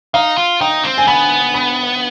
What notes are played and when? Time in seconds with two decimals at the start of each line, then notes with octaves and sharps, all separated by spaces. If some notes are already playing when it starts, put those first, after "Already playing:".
0.14 D#4 F5
0.38 F4
0.61 D#4 G5
0.84 C4
0.98 G#5
1.07 B3 B5
1.54 B5